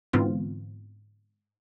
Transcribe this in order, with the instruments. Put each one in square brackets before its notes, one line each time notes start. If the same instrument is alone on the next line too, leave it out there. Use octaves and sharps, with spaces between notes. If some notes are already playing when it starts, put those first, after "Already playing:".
[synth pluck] G#2 D3 E3 B3 C4 F4